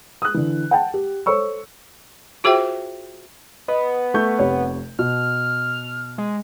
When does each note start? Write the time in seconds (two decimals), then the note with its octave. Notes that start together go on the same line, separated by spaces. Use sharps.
0.22 D#6 F#6
0.34 D3 E3
0.71 F#5 G5 A5
0.94 G4
1.26 A4 C5 C#5 C#6 E6
2.44 F4 F#4 G#4 C5 E5 G5
3.68 B3 D#5
4.14 A3 C#6 G6
4.39 F1 C3 C#5
4.99 B2 F6
6.18 G#3